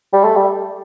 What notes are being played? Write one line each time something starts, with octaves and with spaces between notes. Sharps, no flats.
G3
A3
G3